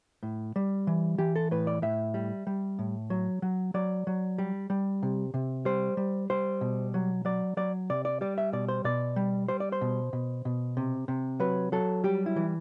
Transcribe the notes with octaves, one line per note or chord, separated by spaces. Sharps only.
A2
G3
E3
E3 G4
A4
A2 B4
D5
A2 E5
G3
G3
A2
F#3
F#3
F#3 D5
F#3
G3
G3
C3
C3
G3 C5
G3
G3 C5
B2
F#3
F#3 D5
F#3 D5
C3 D5
D5
G3 D5
E5
B2 D5
C5
B2 D5
G3
G3 C5
D5
C5
B2
B2
B2
C3
C3
F#3 B4
F#3 A4
G3 G4
E4
E3